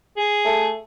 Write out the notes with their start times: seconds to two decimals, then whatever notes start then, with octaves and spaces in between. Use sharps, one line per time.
0.17 G#4
0.45 A3